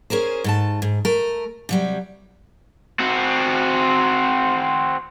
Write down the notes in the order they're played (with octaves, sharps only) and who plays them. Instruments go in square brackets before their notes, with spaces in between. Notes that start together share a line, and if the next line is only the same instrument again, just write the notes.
[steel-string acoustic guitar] C#4 G#4 A#4 C5
G#2 A3 A5
G#2
A3 A#4
C3 F#3 G3
[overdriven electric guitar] C4 F#4